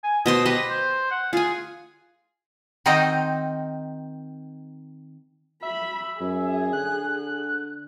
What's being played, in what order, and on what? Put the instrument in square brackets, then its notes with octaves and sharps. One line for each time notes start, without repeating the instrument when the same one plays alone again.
[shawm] G#5
[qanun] B2 C5 C6 [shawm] D#6
[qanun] G4 D#5 C6 [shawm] B4
[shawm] C5
F#5
[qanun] F4 G#5 [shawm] G#4
[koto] D#3 C4 D#4 F#4 C5 D#5
[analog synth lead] E5 [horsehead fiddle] B5
[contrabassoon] F#2 [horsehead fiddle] G#4
[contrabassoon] D3 [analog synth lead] F#6